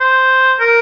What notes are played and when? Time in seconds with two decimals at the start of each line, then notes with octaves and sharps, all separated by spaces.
0.01 C5
0.61 A#4